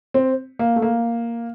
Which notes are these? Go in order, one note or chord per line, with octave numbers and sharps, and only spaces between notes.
C4
A#3
A3
A#3